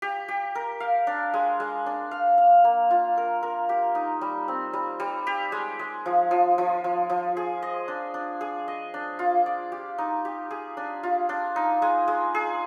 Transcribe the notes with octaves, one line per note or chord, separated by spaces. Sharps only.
G4
G4
A#4
F5
D4
G#3
G#3
D4
F5
F5
A#3
F4
A#4
A#4
G4
D#4
G3
C4
G3
G3
G4
G#3
G#3
F3
F3
F3
F3
F3
G#4
D#5
D4
D4
G#4
D#5
D4
F4
D5
G4
D#4
G4
G#4
D4
F4
D4
D#4
G#3
G#3
G#4